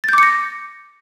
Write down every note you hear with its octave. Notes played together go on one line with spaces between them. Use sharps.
D6 G6 A6 A#6 C#7